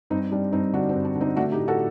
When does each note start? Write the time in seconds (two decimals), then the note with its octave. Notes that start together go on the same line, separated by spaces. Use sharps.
0.10 G2 C4 D#4
0.32 G3 D4
0.53 G2 C4 D#4
0.73 D3 D4 F#4
0.89 C4
0.95 G2
1.05 D4
1.15 D3
1.21 C4 D#4
1.36 A3 D4 F#4
1.52 D#4 G4
1.58 A2
1.68 F#4 A4